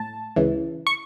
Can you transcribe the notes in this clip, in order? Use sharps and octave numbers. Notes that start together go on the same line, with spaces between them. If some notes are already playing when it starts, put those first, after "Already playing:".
Already playing: A2 A5
C#2 C#3 E3
C#6